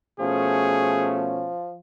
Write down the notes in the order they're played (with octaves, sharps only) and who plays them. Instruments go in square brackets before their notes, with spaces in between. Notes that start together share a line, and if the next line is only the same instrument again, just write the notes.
[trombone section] B2 A3 C#4 [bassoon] F3 [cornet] G#4